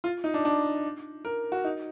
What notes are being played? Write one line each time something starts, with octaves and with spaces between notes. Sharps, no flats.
F4
D#4
D4
D4
A#4
F#4
D#4